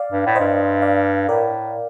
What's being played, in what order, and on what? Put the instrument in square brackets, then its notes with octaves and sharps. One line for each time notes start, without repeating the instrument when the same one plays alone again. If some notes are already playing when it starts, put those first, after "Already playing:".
Already playing: [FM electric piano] D5 F5
[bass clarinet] G2
A2
[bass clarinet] G2 [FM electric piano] C5 D#5
[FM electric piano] D5 F5
[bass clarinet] A2 [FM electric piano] A#4 D5